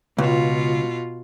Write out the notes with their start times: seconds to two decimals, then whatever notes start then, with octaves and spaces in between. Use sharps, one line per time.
0.18 C#2 B2 F4